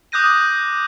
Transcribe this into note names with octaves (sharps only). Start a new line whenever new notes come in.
D6 D#6 F#6 G6 A#6 D#7